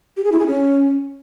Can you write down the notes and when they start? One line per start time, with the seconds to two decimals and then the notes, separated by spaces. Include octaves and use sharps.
0.17 G4
0.24 G#4
0.32 E4
0.39 G#4
0.47 C#4